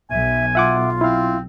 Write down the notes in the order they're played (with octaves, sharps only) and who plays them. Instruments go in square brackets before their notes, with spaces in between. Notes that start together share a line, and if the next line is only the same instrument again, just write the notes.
[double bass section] B1 [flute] E5 [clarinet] G#5
[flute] F4 [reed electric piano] E5 F#5 D6
[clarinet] C4 [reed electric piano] E4 F5